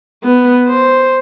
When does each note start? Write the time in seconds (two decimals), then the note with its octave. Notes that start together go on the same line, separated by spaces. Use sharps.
0.23 B3
0.68 C5